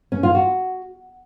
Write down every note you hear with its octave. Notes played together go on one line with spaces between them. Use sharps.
C#4
F4
F#4